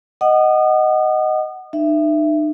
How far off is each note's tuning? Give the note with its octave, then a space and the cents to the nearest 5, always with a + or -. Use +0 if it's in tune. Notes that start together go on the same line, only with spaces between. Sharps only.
D#5 +0 F#5 +15 D#6 -35
D#4 -40 E5 +15